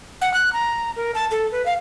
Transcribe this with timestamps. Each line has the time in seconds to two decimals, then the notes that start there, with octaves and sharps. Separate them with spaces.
0.21 F#5
0.34 F#6
0.53 A#5
0.96 A#4
1.15 A5
1.31 A4
1.52 B4
1.66 F5